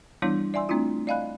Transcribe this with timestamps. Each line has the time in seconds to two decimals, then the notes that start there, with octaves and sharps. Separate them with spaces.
0.22 E3 G3 B3 D4 E4 C#5
0.54 D5 E5 G#5 C6 E6
0.69 A3 C4 D4 E4 F4
1.07 D5 D#5 F5 G#5 B5 F#6